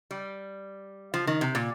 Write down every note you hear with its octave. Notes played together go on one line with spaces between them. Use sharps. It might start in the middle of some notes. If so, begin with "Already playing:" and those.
G3
F3
D#3
C3
A#2